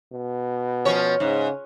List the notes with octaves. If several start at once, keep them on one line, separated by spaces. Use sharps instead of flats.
B2
F3 C#4 C#5
G#2 C#3